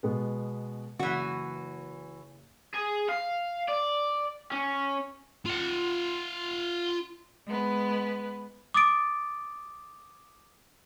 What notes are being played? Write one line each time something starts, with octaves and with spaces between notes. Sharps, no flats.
B2 G#3 B3
F#1 E3 F#4
G#4
F5
D5
C#4
F4 F#5
G#3 B3 B4
D6 D#6 A6 D7